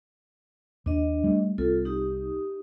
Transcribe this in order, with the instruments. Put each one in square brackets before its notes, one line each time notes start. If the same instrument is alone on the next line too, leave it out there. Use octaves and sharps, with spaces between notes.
[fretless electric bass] D#2 [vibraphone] D4 D#5
[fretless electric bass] G3 A3
[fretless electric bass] C2 C4 [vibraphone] F4 A4
[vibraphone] D#4 G4 D#6